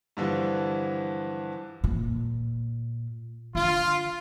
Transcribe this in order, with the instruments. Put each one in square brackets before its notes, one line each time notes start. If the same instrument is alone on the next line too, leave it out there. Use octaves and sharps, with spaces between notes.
[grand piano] G2 D3 E3 F3
[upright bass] A#2
[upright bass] D3 [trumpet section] F4